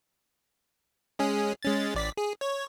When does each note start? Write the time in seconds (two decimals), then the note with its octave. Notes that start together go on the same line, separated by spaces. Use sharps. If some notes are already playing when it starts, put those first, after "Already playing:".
1.19 G#3 C#4 G#4
1.63 G#3 C#4 A6
1.95 A1 D5 B6
2.17 G#4
2.41 C#5